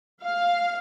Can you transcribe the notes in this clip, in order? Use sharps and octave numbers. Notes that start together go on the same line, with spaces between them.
F5